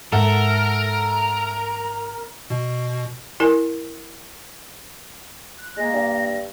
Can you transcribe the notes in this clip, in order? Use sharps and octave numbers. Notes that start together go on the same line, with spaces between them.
G#2 A4 A#4 E5 F#5
B2
E4 A#4 G#5
F#6
G#3 A#3 A#6
G2